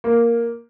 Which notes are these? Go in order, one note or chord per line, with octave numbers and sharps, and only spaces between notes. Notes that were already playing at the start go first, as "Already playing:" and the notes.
A#3